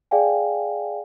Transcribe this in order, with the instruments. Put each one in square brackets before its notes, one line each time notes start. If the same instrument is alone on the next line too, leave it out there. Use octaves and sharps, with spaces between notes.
[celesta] G#4 D5 F5 G5 G#5